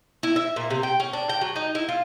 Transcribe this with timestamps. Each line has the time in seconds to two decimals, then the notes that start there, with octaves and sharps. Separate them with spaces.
0.23 E4
0.36 E5
0.56 A#2
0.70 C3
0.83 G5
1.00 C#4
1.13 D4
1.29 G5
1.41 F#3
1.56 D#4
1.75 E4
1.89 F4